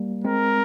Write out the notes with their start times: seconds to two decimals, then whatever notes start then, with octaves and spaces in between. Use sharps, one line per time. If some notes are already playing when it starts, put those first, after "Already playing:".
Already playing: G3 A#3
0.24 G#3 C4 A#4